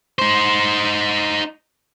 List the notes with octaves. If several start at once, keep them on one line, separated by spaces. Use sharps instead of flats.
D#4 C5